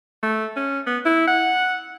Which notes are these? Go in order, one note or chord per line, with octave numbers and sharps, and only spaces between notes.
A3
C#4
B3
E4
F#5